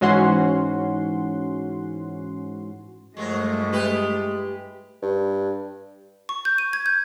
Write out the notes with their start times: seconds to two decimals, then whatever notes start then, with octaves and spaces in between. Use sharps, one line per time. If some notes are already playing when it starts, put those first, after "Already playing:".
0.01 G#2 E3 C#4 F#4 F#5 C6
3.17 G2 F3 F#3 G#3 A3 A#4
3.73 E4 G4 B4
5.02 G2
6.29 C#6
6.45 G6
6.58 D#7
6.73 G#6
6.86 G6